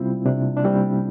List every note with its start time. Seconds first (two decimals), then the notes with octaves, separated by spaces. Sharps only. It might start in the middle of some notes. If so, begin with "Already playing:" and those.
Already playing: C3 G3 C4 E4 F4
0.26 C3 D4
0.57 D4
0.64 G3 C4 E4